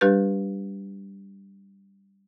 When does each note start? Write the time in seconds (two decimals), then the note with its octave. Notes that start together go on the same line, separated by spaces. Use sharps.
0.01 G3 D4 G4 B4 G6